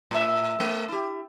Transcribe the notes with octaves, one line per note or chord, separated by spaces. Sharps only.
A2 E5
A3
E4 G4